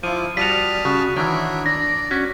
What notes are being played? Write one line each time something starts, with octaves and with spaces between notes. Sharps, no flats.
F3 E4 F4 D6 D#7
G3 F4 F#4 A5 D#6 F6 B6 F7
C#3 F#4
D#3 E3 D4 F#4 C#5 E5
D4 D5 A#6
C#4 F#4 B6